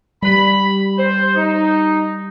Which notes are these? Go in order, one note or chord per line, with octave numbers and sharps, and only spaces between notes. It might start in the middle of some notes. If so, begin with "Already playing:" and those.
G3 B5
C5
D#4